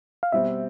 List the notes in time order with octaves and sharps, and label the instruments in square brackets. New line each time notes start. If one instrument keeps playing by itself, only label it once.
[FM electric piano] F5
[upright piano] B2 G3 C4 [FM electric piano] E5